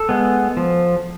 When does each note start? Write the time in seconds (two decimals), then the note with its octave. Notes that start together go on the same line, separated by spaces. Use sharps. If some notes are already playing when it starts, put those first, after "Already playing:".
Already playing: A4
0.09 G#3 B3
0.57 F3